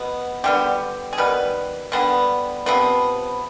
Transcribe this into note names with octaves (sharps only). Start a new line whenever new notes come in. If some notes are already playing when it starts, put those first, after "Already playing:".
Already playing: B2 B3
D3 G3 B3 G4
G#4
D#3 G3 B3 B4
D3 G3 B3
C3 F3 B3